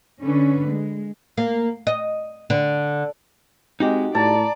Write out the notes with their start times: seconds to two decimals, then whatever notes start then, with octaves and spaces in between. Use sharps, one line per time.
0.21 D3 C#4 B4
0.67 G#3
1.38 A#3
1.87 D#5
2.50 D3
3.80 G#3 C4 D#4 F#4 G4
4.15 A2 D5 A5 A#5